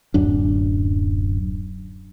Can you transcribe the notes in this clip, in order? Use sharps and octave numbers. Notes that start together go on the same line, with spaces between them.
D1 F#2 D4